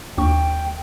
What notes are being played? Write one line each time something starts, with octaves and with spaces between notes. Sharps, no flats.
D#2 D4 G5 C#6